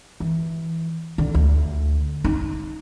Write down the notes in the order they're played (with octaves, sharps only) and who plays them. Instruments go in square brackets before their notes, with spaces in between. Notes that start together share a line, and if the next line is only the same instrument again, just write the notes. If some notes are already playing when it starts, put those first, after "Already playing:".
[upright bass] E3
D3
D2
D#4